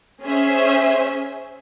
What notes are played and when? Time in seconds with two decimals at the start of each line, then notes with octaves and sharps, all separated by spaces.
0.23 C#4 G#4 C5 E5